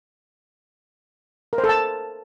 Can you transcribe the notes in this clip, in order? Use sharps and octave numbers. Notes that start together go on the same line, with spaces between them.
A#4
C5
A4
A5